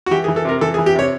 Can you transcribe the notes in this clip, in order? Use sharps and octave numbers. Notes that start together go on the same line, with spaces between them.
F#4
E3 G4
G#4
E3
A4
C3 A#4
E3 A4
G#4
E3
G4
C3 C#5